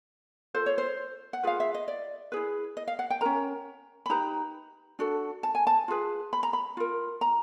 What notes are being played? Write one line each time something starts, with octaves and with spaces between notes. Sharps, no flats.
F4 A4 C5
C#5
C5
F#5
F4 G#4 B4 F5
E5
D#5
D5
E4 G#4 B4
D#5
F5
F#5
G5
C#4 F4 A#4 A#5
B5
D#4 G4 B4 A#5
D4 F#4 A4
A5
G#5
A5
F4 G#4 B4
B5
A#5
B5
F4 A#4
A#5